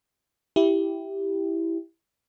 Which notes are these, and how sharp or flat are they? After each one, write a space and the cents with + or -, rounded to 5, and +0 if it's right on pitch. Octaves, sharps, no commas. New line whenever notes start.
E4 +0 G4 +0